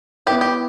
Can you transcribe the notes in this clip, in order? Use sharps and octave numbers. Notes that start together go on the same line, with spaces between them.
B3 E4 G4 B4 E5
G4